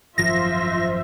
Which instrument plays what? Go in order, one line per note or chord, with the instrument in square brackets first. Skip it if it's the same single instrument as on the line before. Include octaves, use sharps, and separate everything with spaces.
[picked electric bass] G#1 F#2 F3 [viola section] F4 C5 E5 [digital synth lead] A#6